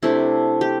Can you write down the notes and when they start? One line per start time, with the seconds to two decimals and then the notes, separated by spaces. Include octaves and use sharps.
0.03 C3 A3 D4 E4
0.61 G4